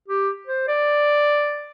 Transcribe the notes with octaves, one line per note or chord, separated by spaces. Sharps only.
G4
C5
D5